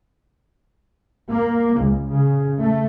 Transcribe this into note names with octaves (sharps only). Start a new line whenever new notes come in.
A#3
C#2
C#3
A3